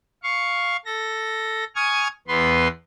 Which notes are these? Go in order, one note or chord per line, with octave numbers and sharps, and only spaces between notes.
F5 C#6
A4 A#6
G#5 C#6 D#6 F6 G#6
E2 B3 B4 C6